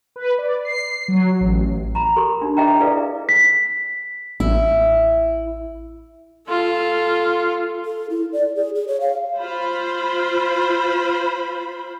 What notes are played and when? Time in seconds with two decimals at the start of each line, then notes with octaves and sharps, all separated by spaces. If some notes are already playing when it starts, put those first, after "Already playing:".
0.16 B4
0.38 D5
0.65 C7
1.08 F#3
1.41 A1
1.95 A#5 B5
2.16 G4 A4 A#4 B5 C6
2.42 D4 D#4
2.57 G#4 A4 D#5 E5 G5 A#5
2.80 E4 G#4 A4 B4 D5 F5
3.29 B6
4.40 A1 E4
6.48 F4 A4
7.85 A4
8.10 E4
8.33 D5
8.55 G#4
8.75 G#4
8.88 C#5
9.01 F5
9.39 F4 C5 B5